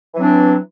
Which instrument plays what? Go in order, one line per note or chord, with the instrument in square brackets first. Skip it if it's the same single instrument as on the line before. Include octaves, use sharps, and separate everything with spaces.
[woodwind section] E3
F#3
C4
D4